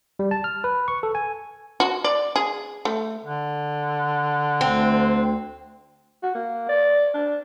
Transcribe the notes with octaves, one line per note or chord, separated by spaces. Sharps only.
G3
A5
F6
B4
C#6
A4
G#5
F#4
D5
G#4
A3
D3
D2 C4
F#4
A#3
D5
D4